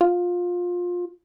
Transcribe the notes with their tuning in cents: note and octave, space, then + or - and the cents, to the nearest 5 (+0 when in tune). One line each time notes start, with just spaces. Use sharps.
F4 +20